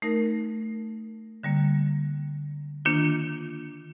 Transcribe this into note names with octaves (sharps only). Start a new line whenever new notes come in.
A3 D#4 A#4
D3 G3 A#3
D#3 A#3 D4 F4